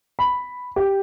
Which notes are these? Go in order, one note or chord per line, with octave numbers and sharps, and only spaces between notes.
B5
G4